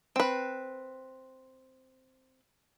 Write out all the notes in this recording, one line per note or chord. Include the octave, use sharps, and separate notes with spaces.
C4 B4